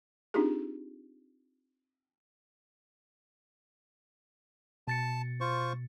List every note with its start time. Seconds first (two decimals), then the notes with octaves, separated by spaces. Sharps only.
0.34 C4 D4 D#4 F4 G4 G#4
4.88 B2 A5 A6 C#7
5.41 F4 C5 C#6